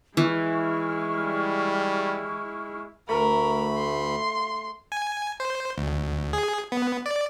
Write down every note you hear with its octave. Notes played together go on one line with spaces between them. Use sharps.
E3 G#3 E4 C#6 F6
G3
D2 A3 A#4 B5
C6
G#5
C5
D2
G#4
B3
D5